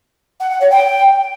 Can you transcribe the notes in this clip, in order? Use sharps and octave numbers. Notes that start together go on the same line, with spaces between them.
F#5
F#5
C#5
G5